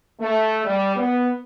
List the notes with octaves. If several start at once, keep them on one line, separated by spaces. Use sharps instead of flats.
A3
G3
B3